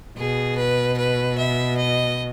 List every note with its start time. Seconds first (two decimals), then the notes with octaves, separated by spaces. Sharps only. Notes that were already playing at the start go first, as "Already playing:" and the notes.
0.17 B2 G#4
0.58 B4
0.98 B4
1.38 E5
1.78 D#5